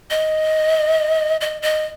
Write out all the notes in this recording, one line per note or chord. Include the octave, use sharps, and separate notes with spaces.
D#5
D#5
D#5